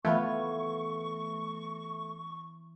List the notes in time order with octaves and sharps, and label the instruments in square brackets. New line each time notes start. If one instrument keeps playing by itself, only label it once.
[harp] E3 [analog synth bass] A3 [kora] B3 F4 C#5 [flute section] C#6